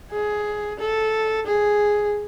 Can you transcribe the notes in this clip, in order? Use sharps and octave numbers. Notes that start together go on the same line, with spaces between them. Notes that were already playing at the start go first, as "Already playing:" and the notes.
G#4
A4
G#4